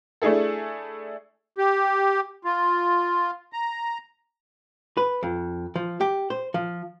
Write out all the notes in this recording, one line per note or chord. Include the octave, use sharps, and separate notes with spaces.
A3 D4 E4 G#4 A4
G4
F4
A#5
B4
F2
F3
G4
C5
F3